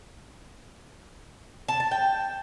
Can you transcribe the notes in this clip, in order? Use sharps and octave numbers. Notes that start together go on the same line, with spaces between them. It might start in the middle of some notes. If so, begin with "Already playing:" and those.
A5
A5
G5